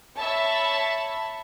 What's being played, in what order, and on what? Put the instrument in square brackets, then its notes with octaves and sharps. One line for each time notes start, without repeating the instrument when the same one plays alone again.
[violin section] C#5 E5 A5 B5